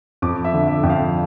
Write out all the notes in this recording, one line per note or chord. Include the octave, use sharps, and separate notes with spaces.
F2 D6
E5
D3
E5
F2 G5
F5